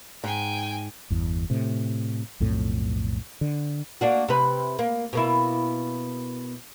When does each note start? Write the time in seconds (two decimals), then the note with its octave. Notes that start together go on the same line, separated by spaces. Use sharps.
0.24 G#2 G5 G#5
1.10 G1 E2
1.50 A2 C3
2.40 B1 F2 A2
3.41 D3
4.01 A#3 D4 F#4
4.28 C3 B4
4.79 A#3
5.13 B2 A#3 E4